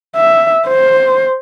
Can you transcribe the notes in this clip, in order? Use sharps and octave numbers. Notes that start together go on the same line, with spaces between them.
E5
C5